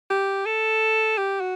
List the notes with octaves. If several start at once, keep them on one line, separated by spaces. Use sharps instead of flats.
G4
A4
G4
F#4